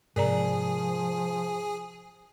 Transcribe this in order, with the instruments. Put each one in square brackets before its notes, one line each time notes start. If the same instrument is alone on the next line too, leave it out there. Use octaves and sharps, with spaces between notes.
[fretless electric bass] G#2 C3 [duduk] F3 [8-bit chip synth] G#4 [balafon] A#4 D5 A#5